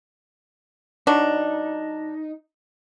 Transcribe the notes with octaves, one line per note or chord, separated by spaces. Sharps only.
F#3 D4 D#4